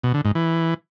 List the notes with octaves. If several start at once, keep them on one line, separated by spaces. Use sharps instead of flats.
B2
D3
G#2
E3